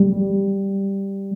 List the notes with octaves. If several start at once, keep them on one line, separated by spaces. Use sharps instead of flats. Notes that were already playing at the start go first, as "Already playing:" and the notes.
Already playing: G3